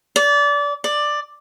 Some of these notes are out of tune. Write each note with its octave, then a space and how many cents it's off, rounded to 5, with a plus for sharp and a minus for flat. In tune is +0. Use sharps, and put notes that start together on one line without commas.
D5 -25
D5 +10